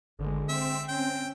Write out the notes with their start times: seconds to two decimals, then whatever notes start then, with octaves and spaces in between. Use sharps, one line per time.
0.19 G#1 D3 G#3
0.49 C4 E5
0.89 C#4 G5